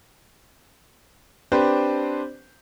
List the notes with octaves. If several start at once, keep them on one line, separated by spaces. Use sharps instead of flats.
C4 D4 G4 B4 C5